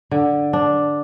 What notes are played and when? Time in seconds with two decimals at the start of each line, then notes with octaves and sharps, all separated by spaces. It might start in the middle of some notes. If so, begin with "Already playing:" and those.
0.11 D3
0.53 D4